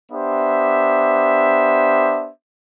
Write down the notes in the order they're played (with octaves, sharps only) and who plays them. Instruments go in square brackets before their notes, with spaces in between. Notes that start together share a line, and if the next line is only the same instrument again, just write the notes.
[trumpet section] B3 D4 G4 C5 E5